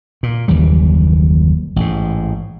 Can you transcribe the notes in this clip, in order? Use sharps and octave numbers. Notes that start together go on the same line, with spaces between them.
A#2
F#1 D#2 E3 G3
A1 G#2